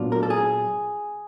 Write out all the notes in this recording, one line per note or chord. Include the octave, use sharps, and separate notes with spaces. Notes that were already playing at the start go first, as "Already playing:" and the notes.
Already playing: A#2 F#3 B3 D4 F4
A#4
A4
G#4